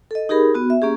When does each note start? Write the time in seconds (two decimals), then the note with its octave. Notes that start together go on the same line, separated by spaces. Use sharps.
0.11 A4 D#5
0.29 D#4 G4 G#4 A#4 B5
0.54 B3 F#4
0.70 E5
0.82 A#3 C#4 G4 G#4